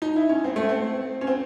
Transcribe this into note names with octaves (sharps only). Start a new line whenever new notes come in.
D#4
E4
C#4
C4
A3
C4
C#4
C4